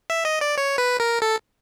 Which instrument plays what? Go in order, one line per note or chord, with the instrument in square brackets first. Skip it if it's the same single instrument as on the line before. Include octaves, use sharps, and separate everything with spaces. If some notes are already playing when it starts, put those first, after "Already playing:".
[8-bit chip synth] E5
D#5
D5
C#5
B4
A#4
A4